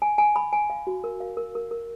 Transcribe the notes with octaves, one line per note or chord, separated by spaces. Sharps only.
G#5
G#5
B5
G#5
F5
F#4
A#4
F5
A#4
A#4
A#4